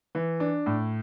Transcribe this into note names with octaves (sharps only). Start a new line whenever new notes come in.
E3
D4
A2